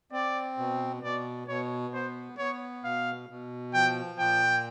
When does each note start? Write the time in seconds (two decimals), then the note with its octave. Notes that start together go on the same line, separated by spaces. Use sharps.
0.12 C4 D5
0.58 B2
1.03 B2 D5
1.48 B2 C#5
1.94 B3 C5
2.38 B3 C#5
2.84 B2 F5
3.29 B2
3.74 F3 G5
4.19 A#2 G5